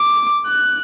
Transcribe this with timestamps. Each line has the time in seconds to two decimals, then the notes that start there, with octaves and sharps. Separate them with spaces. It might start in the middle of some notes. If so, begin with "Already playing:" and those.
Already playing: D6
0.47 F#6